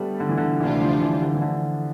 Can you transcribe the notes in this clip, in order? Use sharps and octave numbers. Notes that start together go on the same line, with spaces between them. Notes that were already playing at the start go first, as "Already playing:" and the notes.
Already playing: G3 A3 B3 D4
D3
E3
D3
D2 C3 E3 G3 D4 F4
F3
E3
D3
E3
D3